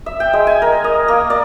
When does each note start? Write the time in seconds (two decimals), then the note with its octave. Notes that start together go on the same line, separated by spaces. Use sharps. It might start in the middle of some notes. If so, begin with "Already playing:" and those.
0.06 E5
0.20 G5
0.33 G#3
0.47 G#5
0.62 A#4
0.84 D#5
1.08 A#3
1.30 D5